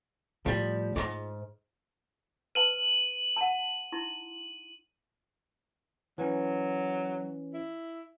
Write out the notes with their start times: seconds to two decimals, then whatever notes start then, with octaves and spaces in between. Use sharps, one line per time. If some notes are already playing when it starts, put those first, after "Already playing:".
0.46 A2 F3 G3
0.96 B1 G#2 F4
2.55 B4 F5 A5 D#7 F#7
3.36 F#5 A5
3.92 D#4 E4 C6
6.18 E3 F#3 C#4
7.54 E4